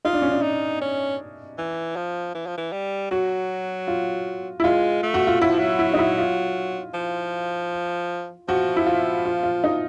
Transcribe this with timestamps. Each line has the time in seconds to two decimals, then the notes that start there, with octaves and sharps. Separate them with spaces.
0.05 D#4 F4
0.13 D4
0.22 C#4
0.31 D4
0.43 D#4
0.82 C#4
1.58 E3
1.96 F3
2.35 E3
2.46 F3
2.58 E3
2.73 G3
3.11 F#3 F#4
3.88 F4
4.60 E4
4.64 G#3 F4
5.03 A3
5.14 F#4
5.27 F4
5.41 F#3 E4
5.50 F3
5.59 F#3
5.79 E4
5.94 D#4
5.99 E4
6.18 F4
6.94 F3
8.48 F3 F#4
8.77 E4
8.87 F4
9.25 F4
9.43 F4
9.64 D#4